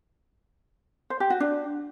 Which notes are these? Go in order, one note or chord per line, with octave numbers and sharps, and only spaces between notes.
C5
G4
F#4
D4